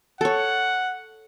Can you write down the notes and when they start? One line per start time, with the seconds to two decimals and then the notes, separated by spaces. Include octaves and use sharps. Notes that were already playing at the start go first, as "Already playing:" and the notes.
0.21 A4 C#5 F#5